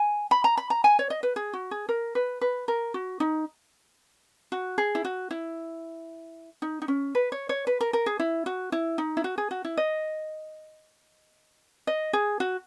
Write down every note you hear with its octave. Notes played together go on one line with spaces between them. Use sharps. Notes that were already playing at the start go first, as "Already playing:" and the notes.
Already playing: G#5
B5
A#5
B5
A#5
G#5
C#5
D#5
B4
G#4
F#4
G#4
A#4
B4
B4
A#4
F#4
D#4
F#4
G#4
E4
F#4
E4
D#4
D#4
C#4
B4
C#5
C#5
B4
A#4
A#4
G#4
E4
F#4
E4
D#4
E4
F#4
G#4
F#4
E4
D#5
D#5
G#4
F#4